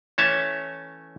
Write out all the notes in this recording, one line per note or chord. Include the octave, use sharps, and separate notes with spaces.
E3 A3 C#4 C#5 E5 A5